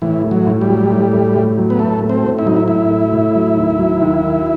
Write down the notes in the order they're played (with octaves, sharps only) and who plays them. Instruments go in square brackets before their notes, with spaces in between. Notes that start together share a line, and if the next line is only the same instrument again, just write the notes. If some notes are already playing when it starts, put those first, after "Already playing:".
[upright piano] A2 [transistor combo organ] E3
[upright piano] A3
[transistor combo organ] F#3
[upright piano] A2
[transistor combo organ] G3
[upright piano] F#3
A2
A3
A2
F#3
[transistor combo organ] B3
[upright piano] A2 [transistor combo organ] A3
[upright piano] A3
[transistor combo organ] C4
[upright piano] A2
[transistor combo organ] E4
[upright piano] F#3 [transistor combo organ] D#4
[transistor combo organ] E4
[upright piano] A2 [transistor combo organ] E4
[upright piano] A3
A2
F#3
D#2
F#3
D#2
D#3